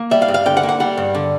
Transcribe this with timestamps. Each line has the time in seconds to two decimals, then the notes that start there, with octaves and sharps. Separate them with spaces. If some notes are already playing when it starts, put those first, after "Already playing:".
Already playing: A#3
0.11 G3 E5
0.22 F5
0.28 G2
0.34 F5
0.46 D3 G5
0.57 F#5
0.63 A#3
0.69 F#5
0.80 G3 F#5
0.97 G2
1.15 D3